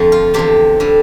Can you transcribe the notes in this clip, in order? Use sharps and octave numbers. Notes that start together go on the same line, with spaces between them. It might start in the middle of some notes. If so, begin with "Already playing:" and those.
Already playing: F2 D3 F3
F4
E2 D3 F3 G4
D3 G3